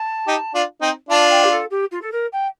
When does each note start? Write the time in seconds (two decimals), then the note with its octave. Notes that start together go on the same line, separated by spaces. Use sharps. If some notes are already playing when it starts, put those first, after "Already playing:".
Already playing: A5
0.27 D#4 G4
0.54 D4 F4
0.81 C4 D#4
1.09 D4 F4 A5
1.30 G5
1.43 G4
1.50 A4
1.70 G4
1.91 F4
2.01 A4
2.12 A#4
2.32 G5